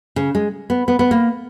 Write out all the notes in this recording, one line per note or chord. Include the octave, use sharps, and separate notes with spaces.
C#3
G#3
B3
B3
B3
A#3